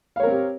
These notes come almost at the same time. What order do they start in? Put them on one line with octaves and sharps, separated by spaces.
F5 C#5 A#4 C4 G4